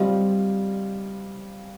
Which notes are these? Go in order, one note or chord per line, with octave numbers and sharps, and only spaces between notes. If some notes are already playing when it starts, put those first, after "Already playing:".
Already playing: G3 C4 F4 C5 D#5